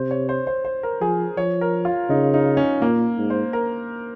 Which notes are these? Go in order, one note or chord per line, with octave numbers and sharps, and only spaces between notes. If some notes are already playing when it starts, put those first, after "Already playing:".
Already playing: C3 C5
C#5
C5
C5
C5
A#4
F3 G#4
F3 C#5
A#4
F4
C#3 D#4
D#4
C#4
A#2 A#3
G#2
C5
A#4